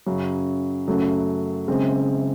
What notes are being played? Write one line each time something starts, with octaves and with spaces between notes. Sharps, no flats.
F#2 C#3 F#3
F#2 C#3 F#3 A3
F#1 F#2 C#3 G#3 C4